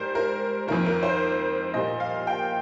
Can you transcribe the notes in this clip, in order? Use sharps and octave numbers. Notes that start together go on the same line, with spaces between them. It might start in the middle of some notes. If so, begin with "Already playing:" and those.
Already playing: G#2 G3 A#4 C5
A#4
F2 D#3 A#3 A#4
A#4
C5
A#2 G3 A#3 D#5
F5
G5